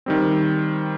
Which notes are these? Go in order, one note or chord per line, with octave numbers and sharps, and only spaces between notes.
D#3 G3 C4